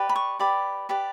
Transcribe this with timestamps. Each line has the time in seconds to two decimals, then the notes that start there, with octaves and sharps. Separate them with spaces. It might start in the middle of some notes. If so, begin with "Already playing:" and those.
Already playing: G4 B4 D5
0.09 B5
0.16 C#6
0.39 G4 B4 D5 B5
0.89 G4 B4 D5